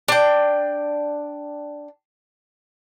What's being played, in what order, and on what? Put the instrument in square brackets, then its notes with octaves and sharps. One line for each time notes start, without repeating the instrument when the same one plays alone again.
[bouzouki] D4 G5